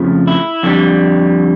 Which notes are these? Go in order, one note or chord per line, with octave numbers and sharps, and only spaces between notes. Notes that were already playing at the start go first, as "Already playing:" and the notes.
Already playing: F2 C#3 F3 A3
E4
F2 D3 G3